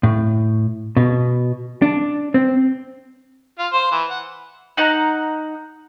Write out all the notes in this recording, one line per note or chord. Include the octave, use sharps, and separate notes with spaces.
A2
B2
D4
C4
F4
C5
E3
F#5
D#4 F#5 A#5